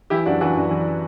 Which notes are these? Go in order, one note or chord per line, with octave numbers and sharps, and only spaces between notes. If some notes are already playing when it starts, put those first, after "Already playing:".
E3 E4 G4
F#2 D4 F#4
E3 D4 F#4
F#2
E3